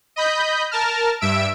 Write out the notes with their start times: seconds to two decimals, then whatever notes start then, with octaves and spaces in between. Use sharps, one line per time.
0.16 D#5 B5 G6
0.71 A#4 A5 F6
1.21 G2 E5 E6 D7